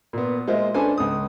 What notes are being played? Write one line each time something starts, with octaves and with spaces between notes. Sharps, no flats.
A#2 B3
G#3 A#3 F4 C5 E5
C#4 D4 A4 B4 C5 G#5
C#2 D#6